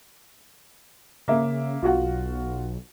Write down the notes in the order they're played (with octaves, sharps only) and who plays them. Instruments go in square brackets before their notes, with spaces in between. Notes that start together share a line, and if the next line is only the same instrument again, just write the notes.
[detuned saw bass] C#3 [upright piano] A#3 E5
[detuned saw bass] B1 [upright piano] F4 F#4 F#5